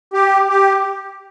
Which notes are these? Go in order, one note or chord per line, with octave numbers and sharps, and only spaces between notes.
G4
G4